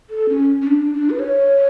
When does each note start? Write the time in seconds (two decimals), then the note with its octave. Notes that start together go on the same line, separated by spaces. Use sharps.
0.10 A4
0.29 C#4
0.62 C#4
0.67 D4
0.93 D4
1.10 B4
1.19 C#5